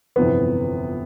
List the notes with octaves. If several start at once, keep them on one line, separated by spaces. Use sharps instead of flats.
G1 F2 C3 E3 B3